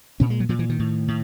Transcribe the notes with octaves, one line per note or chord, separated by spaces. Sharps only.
A#2 C#4
G#3
F#3
A#2 F3
E3
D#3
A2
A2